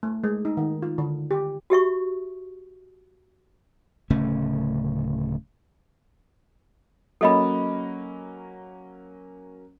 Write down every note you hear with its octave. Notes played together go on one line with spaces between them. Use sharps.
A3
G#3
D#4
D#3
F4
D3
G4
F#4 G4 E5 C#6
D1 C#3 A3 C#4
F#3 A#3 C#4 A4 D#5 B5